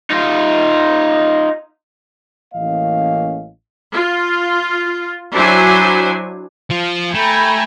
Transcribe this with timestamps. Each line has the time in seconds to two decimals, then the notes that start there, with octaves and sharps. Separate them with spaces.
0.11 D#4 F4
2.54 A1 E3 A#3 C#4 D#5 F5
3.93 F4
5.32 F#3 D4 E4 C5 G#5
6.71 F3 F4
7.15 A3 G5 G#5 A#5 B5